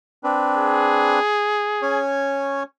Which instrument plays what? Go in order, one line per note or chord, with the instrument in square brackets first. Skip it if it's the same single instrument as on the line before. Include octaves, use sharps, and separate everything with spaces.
[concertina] C4 D4 B4
[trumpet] G#4
[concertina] C#4 C#5 G#5